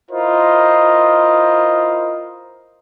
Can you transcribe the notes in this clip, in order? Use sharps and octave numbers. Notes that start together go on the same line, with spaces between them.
E4 F4 A#4 C5 D#5